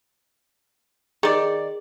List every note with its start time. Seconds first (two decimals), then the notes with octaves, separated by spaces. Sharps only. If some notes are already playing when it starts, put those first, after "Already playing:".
1.23 D#3 G#4 D5